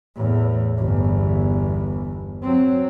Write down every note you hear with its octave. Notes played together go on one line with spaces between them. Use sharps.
E2 A2
G1 E2
F#3 C4